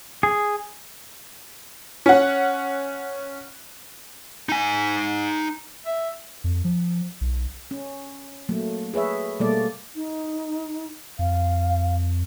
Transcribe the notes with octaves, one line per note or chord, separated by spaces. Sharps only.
G#4
C#4 F#5
D#4 G#5
E5
F2
F3
B1
C#4
F#3 A3 A#3
G#4 B4 C#5 E5
B2 G3 A3 A#3 A4 D5
D#4
F2 F5